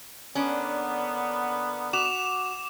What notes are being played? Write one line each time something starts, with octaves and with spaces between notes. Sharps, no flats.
D3 A#3 B3 C#4 D4
F#4 D6 E7 F7